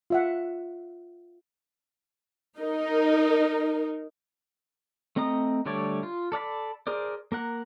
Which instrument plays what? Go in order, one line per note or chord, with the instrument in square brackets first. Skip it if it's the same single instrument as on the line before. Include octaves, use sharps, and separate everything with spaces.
[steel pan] F4 E5 F#5
[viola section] D#4 A#4
[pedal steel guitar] A3 C4 D#5 A#5 D#6
D3 G3 A3 C#5 D5
F4
A4 D5 F5 B5
G#4 A#4 C5 D5
A#3 A#4 F#5